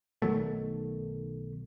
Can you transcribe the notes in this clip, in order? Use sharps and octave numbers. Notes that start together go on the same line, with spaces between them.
B1 D#3 F#3 A3